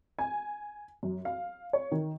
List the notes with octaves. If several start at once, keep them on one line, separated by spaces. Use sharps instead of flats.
G#5
F#2
F5
C#5
D#3